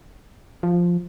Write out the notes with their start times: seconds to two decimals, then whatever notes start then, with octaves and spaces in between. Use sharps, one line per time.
0.63 F3